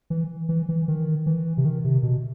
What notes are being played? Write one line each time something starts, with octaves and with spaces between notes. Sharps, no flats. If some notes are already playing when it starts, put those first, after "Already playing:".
E3
E3
E3
D#3
E3
C3
D#3
C3
B2